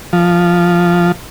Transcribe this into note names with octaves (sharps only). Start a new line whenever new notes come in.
F3